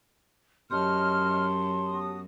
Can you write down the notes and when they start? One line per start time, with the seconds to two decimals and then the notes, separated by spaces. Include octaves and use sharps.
0.71 F#2 G4 C#5 D#5 A5 C6 F6
1.87 B3 F#4 D#6